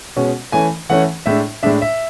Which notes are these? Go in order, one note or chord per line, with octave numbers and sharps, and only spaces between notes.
B2 G#3 C#4
E3 A3 C#4 G#5
E3 A3 C#4 F#5
A2 G#3 D4 E5
A2 G#3 D4 E5
E5